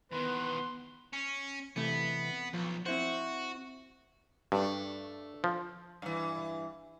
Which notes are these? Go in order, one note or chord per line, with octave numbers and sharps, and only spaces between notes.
E2 D#3 B3 B4 C6
C#4
C3 E3 A3 B3
B1 F3
C4 E4 F#4 C5
G2 A3 D4
F3
G2 E3